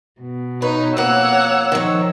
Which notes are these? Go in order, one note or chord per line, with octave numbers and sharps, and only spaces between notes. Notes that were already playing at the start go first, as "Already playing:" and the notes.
B2
D#4 B4 C#5
F2 A#3 C#5 F#5 E6
D#3 F3 C#5